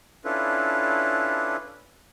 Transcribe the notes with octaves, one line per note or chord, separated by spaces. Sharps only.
C#4 D4 E4 F4 A4 B4